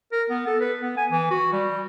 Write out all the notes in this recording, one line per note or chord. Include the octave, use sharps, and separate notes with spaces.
A#4
B3
A4
B4
B3
G#5
E3
F#4
G3